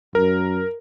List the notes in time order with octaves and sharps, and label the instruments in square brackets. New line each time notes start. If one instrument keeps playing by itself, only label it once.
[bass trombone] F#2 [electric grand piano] A#4